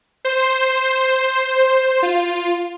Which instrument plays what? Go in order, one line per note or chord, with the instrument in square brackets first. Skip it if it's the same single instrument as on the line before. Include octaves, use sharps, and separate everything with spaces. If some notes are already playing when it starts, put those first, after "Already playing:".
[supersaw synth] C5
F4